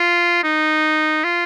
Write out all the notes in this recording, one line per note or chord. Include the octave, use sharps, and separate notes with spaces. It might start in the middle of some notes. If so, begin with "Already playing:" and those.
Already playing: F4
D#4
F4